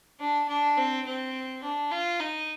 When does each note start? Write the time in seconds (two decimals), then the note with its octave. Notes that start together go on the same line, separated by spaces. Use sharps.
0.21 D4
0.49 D4
0.77 C4
1.06 C4
1.63 D4
1.92 F4
2.20 D#4